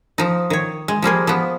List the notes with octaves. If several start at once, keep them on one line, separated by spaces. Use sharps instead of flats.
F3 D#4
D#3 C#5
G#3
F3 G3 A#3 G#4
F3 B3